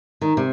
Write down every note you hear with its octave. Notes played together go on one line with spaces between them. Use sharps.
D#3
C3